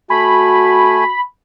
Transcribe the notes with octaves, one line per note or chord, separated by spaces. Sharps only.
A3 F#4 G#5 B5